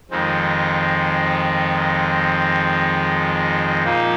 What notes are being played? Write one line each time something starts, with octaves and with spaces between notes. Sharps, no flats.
F2 D#3 G#3 C4
A#2 F3 A#3 D#4